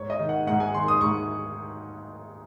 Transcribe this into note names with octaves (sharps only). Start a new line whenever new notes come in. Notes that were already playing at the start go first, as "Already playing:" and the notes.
Already playing: G#2 C#5
D#5
D#3
F#5
G#2 F#5
G#5
D#3 C6
D#6
G#2 C#6